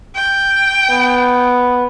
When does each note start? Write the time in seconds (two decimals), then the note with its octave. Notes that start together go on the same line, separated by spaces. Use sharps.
0.15 G5
0.90 B3